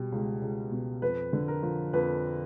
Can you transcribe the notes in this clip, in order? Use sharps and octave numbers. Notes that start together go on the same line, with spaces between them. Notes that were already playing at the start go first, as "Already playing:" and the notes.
Already playing: B2 G3
C#2
C#2
B2
F2 B4
D3
A#4
F3
F2 B4